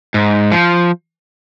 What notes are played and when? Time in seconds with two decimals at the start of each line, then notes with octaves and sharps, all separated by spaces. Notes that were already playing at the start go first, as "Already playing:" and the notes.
0.14 G#2
0.52 F3